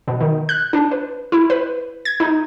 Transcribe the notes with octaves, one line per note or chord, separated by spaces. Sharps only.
B2
D#3
F#6
D4
B4
E4
B4
G#6
D#4